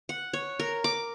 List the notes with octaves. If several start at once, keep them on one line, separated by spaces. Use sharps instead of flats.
F#5
C#5
A#4
D6